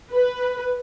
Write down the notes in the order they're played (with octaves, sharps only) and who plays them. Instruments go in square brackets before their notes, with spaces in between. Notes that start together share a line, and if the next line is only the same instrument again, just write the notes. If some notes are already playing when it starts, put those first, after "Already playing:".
[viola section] B4